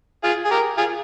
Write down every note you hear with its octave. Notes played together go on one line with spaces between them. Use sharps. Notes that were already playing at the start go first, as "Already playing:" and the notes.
F4 G#4
G#4
G4 A#4
F4 G#4